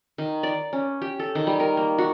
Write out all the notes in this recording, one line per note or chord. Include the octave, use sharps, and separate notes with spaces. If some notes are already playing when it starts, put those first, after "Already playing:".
D#3
D5
C#4
G4
A4
D#3
G3
A#4
A#3
F#4